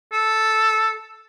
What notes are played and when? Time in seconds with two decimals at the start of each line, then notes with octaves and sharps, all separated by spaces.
0.13 A4